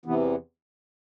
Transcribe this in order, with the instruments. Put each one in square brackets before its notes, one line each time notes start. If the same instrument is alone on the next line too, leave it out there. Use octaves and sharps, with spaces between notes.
[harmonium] E2 C3 E3 B3